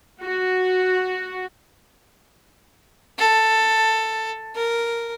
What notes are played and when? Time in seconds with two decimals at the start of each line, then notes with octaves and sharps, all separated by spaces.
0.22 F#4
3.18 A4
4.55 A#4